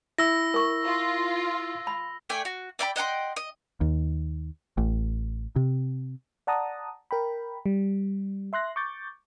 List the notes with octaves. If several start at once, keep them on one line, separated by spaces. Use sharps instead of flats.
E4 B5 E6 A#6
A#4 C#6
F4
B5
A3 D5 G5 G#5
F#4
D5 E5 G5 B5
D#5 F#5 G5 C6
D#5
D#2
A1
C3
D5 F#5 A5 A#5 D#6
A#4 G5 B5
G3
E5 C6 F#6 A#6
C#6 D6 G6 A6